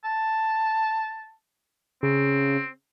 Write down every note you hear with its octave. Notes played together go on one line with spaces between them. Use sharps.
A5
C#3 C4